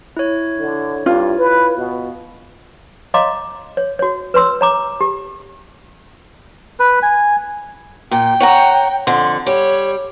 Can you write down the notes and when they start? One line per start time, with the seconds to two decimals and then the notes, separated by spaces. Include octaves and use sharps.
0.17 E4 C#5
0.59 D3
1.06 G2 F4
1.39 B4
1.78 B2
3.14 C#5 D#5 F5 A#5 C6 D6
3.77 C#5
3.99 F#4 C#5
4.34 B4 C#5 C6 E6
4.61 C#5 A#5 D6
5.01 G4
6.80 B4
7.02 G#5
8.11 A#2 G5
8.40 C#5 F#5 A#5
9.07 F2 D3 C6
9.46 G3 C#5